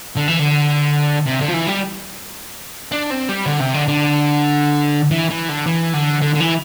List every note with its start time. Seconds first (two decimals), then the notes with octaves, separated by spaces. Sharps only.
0.16 D3
0.28 E3
0.39 D3
1.27 C3
1.41 D3
1.49 F3
1.54 E3
1.68 G3
2.92 D4
3.10 C4
3.29 G3
3.46 D3
3.60 C3
3.74 D3
3.88 D3
5.11 E3
5.30 E3
5.49 D3
5.67 E3
5.94 D3
6.22 D3
6.35 D3
6.41 E3